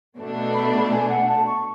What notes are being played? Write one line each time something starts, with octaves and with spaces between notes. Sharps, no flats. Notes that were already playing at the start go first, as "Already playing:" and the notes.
B2 A3 D4
B5
G#5
F#5
A5
C#6